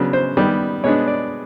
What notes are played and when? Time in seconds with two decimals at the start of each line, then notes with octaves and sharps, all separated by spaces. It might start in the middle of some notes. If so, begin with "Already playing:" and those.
Already playing: C#3 F#3 B3 D4
0.13 C5
0.37 D#3 G3 B3
0.84 B2 G#3 B3 D4 C#5
1.08 D5